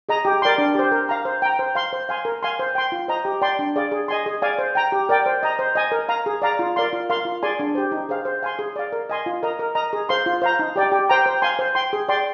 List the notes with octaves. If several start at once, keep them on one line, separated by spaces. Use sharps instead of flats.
G#4 D#5 A#5
G4
A#4 D5 G5 C6
D4
G4 C5
A#4
F5 A#5
C5
G5 A#5
C5
F5 C6
C5
F5 G#5 C6
A#4
F5 G#5 C6
C5
G5 C6
F4
C5 D#5 A#5
G4
D5 G5 C6
D4
G#4 D5 F5
G#4
D#5 G#5 C6
G#4
D5 F5 G#5
C5
G5 A#5
G4
A#4 D5 G5
C5
D#5 A#5
C5
D#5 G#5
A#4
F5 A#5
G#4
D5 F5 A#5
F4
A#4 D5 F5 C6
F4
A#4 F5 C6
F4
G#4 D5 G#5 C6
D4
G4 C5
D#4
G#4 C5 F5
C5
F5 G#5 C6
G#4
D5 F5
A#4
D#5 G#5 C6
F4
A#4 D#5 A#5
A#4
D#5 A#5
G#4
C5 F5 C6
F4
C5 F5 A#5
D#4
G4 D5 G5
G4
C5 G5 A#5
C5
F5 G#5 C6
C5
G5 C6
G#4
D5 G5 C6